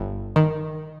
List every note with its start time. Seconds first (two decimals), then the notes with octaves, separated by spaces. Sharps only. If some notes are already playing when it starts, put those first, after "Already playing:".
Already playing: G1
0.36 D#3